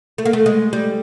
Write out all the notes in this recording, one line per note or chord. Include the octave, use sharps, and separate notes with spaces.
A3
A#3
A3
G#3
G3